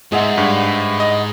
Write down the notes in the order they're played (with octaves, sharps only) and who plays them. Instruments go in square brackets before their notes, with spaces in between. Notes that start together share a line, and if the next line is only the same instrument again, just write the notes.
[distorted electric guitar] G#2 [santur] G#3 E5 F#5
[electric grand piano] G2
D#5